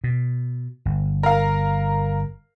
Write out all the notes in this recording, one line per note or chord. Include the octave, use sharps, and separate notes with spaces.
B2
G1
A#4 F5